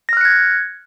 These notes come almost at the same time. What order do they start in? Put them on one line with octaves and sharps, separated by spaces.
A#6 F6 F#6 C#7 G#6